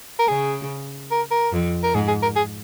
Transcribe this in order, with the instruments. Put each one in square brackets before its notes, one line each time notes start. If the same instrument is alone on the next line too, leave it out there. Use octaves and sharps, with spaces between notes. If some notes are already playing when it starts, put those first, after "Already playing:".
[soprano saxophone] A#4
[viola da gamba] C#3 [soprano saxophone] G#4
[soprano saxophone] A#4
A#4
[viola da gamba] F2
[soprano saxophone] A#4
[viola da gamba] G#2 [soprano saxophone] G#4
[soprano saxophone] G#4
A#4
G#4